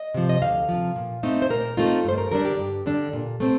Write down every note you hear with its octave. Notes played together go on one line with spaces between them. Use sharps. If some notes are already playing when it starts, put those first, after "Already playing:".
Already playing: D#5
C3 F3
D#5
D2 F5
C3 F3
A#2
A3 C4 D#4
C5
A#2 A#4
A3 C4 D#4 F4
G2 C5
A#4
D3 G3 D4 A#4
G4
G2
D3 G3 D4
A#2
A3 C4